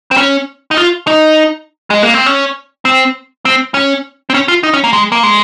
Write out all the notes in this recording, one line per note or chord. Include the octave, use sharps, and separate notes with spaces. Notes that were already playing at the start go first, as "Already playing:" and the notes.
C4
C#4
D#4
F4
D#4
G#3
A#3
C4
C#4
C4
C4
C#4
C4
C#4
F4
D#4
C#4
A#3
G#3
A#3
G#3